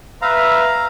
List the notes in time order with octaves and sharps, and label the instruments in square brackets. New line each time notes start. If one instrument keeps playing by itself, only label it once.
[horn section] B4 E5 [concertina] F5 A#5